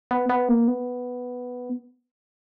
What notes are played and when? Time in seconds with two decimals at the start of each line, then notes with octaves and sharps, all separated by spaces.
0.11 B3
0.30 B3
0.49 A#3
0.68 B3